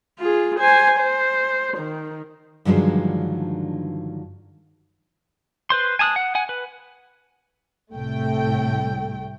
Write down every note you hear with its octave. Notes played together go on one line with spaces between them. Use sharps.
F4 G#4
C5 G#5
C5
D#3
G2 D3 D#3 F3 F#3 G#3
B4 C5 C6
G#5 A5 D#6 F6 F#6
F#5
F#5 G#5
B4
C2 A2 A3 G5